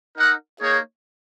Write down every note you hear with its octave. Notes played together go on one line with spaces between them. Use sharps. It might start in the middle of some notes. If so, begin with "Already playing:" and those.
D#4 A#4 D#5 F#5
A#3 D#4 G#4 C#5